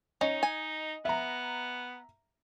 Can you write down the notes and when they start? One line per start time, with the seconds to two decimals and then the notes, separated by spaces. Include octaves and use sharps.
0.21 C#4 D#4 D#5
0.43 G#5
1.05 B3 E5 A#5